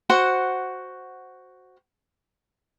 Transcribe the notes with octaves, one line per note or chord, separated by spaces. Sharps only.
F#4 C5 F#5